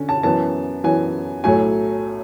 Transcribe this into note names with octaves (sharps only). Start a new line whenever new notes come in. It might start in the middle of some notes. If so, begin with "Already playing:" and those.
Already playing: D3 C#4
A5
F#2 E3 B3 A5
F#2 E3 B3 G#5
B1 A2 F#3 A3 G#5